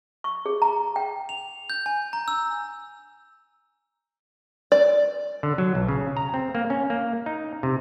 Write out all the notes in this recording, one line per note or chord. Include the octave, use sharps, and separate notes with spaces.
C#6
G#4
A#5
G5
F7
G6
G#5
A#5
E6
D5
D3
F#3
B1
C#3
A#5
C4
A#3
C#4
A#3
D#4
C3